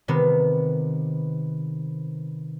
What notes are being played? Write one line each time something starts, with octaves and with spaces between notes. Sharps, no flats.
C3 D#3 B3